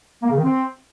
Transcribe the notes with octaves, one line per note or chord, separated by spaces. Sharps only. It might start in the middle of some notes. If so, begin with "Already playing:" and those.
A#3
C#3
D#3
C4